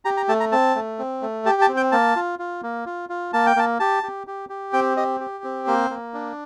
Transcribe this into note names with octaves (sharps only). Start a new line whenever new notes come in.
G4 A#5
A#5
A3 A5
A#5
C4 A5
A3
C4
A3
G4 A5
A5
C4
G5
A#3 A5
F4
F4
A#3
F4
F4
A#3 A5
G5
A#3 A5
G4 A5
G4
G4
G4
C4 G5
G4 D#5
G4
C4
A#3 C5
A#3
D4